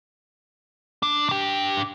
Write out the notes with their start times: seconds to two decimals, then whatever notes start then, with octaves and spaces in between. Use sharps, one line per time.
1.03 D4
1.29 D4 G5